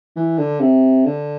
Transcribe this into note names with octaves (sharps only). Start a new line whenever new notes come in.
E3
D3
C3
D3